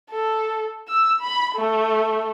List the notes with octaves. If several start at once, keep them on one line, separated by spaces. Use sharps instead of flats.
A4
E6
B5
A3